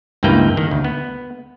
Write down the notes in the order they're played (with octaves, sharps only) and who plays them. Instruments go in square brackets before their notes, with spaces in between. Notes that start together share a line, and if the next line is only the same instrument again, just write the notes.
[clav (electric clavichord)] C#2 G2 E3 A#3 B4 G5
D#3
D2
B3